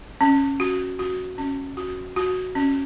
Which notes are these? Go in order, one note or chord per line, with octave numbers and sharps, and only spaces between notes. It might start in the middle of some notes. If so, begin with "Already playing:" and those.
C#4
F#4
F#4
C#4
F#4
F#4
C#4